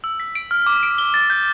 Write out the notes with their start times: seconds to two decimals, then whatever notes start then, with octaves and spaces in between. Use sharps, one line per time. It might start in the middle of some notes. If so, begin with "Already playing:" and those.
0.04 E6
0.20 B6
0.35 D7
0.51 F6
0.66 D6
0.83 D7
0.98 G7
1.14 A6
1.30 G6